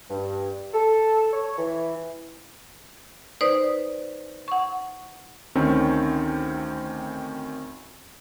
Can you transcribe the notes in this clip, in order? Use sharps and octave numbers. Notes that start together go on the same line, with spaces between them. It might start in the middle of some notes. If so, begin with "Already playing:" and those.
G2
A4
C#5
E3
D#4 B4 C5 D5 D#6
F#5 C#6
D2 D#3 C4 C#4